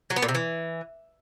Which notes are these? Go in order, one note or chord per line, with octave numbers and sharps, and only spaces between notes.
F#3
B3
A#2
C3
E3